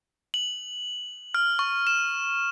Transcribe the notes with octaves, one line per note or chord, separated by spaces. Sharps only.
F#7
F6
C#6
E7